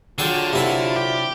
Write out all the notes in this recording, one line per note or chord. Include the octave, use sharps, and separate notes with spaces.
D3 F#3 D4 F4 G#4 A4 G5
C3 E4 A4
G4